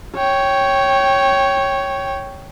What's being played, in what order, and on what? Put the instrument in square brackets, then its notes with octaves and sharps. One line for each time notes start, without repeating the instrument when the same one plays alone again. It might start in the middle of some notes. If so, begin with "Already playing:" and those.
[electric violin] C#5 G5